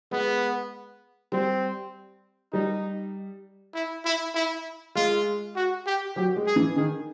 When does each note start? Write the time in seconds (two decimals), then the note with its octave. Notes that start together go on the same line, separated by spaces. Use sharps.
0.11 G#3 B3
1.32 G3 C4
2.53 G3 D#4
3.74 E4
4.05 E4
4.35 E4
4.95 G#3 F4
5.56 F#4
5.86 G4
6.16 F#3 G4
6.36 G#3
6.46 G#4
6.56 E3
6.76 D#3 G#4